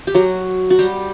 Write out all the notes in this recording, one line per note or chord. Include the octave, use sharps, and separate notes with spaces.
G4
F#3 F#4
F#4
G3 G4